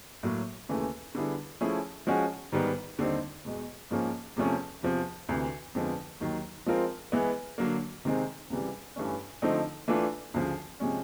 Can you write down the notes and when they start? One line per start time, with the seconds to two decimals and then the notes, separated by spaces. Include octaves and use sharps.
0.23 A2 F#3 A#3
0.69 D#2 C#3 E3 A3
1.15 D3 G3 B3 E4 G#4
1.61 F3 A3 C#4 E4 G#4
2.07 F3 G#3 C#4 F#4
2.52 G#2 D#3 G3 B3
2.98 D#2 D3 G3 C4 D#4
3.45 E2 B2 G#3
3.91 G#2 F3 A#3 C#4
4.36 E2 C3 F3 A3 C#4
4.83 E2 C3 F3
5.29 D2 C3 E3
5.75 F2 D3 F3 G#3 B3
6.21 D#2 D#3 F#3
6.66 F3 G#3 C4 F4 A#4
7.12 E3 G#3 B3 E4
7.58 D3 F#3 A#3
8.05 C3 D#3 G#3 C4
8.50 C#2 C3 E3 G3
8.96 G2 E3 A3 C#4
9.42 D3 F3 A3 C4 D#4
9.88 E3 A3 D4 F4
10.34 D2 C#3 F3
10.80 C3 F3 G#3 C#4